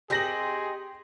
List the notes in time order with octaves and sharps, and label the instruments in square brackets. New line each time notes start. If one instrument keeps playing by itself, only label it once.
[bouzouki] C4 D#4 [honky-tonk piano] G4 A#6 F#7 [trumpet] G#4